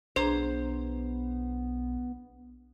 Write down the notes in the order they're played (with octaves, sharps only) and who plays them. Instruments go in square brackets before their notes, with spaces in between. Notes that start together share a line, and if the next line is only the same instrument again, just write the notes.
[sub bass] B1 [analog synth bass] B3 [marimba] D4 G#4 A#5 [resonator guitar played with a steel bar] C5